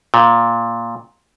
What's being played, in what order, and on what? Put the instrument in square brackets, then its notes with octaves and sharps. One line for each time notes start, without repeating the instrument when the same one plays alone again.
[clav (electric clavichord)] A#2